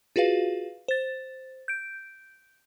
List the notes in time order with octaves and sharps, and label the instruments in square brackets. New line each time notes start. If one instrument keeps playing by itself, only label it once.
[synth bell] F4 F#4 G#4 B4 F5
C5 A6
G6 D7